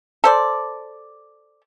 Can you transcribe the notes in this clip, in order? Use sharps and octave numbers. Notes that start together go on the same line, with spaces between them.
A4 C5 D5